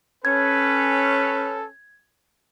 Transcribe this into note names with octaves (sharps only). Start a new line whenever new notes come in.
C#4 A4 B4 G#6